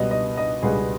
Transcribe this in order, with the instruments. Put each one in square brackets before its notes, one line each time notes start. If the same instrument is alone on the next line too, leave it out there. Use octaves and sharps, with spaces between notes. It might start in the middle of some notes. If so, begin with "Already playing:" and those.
Already playing: [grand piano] C#2 B2 G3 B3 D#5
D#5
D#5
C#2 B2 G3 B3 G#4